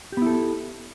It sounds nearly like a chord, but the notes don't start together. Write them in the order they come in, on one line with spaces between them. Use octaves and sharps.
G4 B3 E4 A4